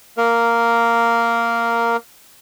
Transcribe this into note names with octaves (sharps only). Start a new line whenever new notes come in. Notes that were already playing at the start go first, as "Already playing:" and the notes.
A#3 A#4